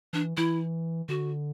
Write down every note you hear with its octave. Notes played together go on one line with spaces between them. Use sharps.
E3 D4
E3 E4
D3 F#4